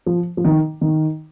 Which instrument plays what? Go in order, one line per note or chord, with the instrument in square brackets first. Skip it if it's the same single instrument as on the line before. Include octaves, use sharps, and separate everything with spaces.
[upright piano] F3
F3
D#3
D#3